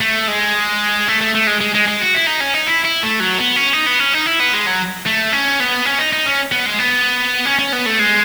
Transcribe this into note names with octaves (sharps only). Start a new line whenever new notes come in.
A3
G#3
A3
A3
A3
G#3
G#3
G#3
G#3
F#4
E4
D#4
C#4
D#4
E4
E4
A3
F#3
B3
C#4
D#4
B3
C#4
D#4
E4
B3
G#3
F#3
A3
C#4
B3
C#4
D#4
D#4
C#4
B3
G#3
B3
C#4
C#4
B3
A3
G#3